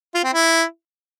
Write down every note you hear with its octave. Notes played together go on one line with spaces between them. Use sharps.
F4
C4
E4